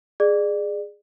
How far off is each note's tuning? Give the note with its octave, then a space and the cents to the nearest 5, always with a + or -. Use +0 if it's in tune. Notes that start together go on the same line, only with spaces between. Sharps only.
G#4 -5 D5 +25